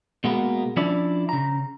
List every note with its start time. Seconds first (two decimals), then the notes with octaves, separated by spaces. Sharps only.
0.24 B2 G#3 A#3 B3
0.77 F3 C#4 D4 E4 D5
1.29 C#3 A#5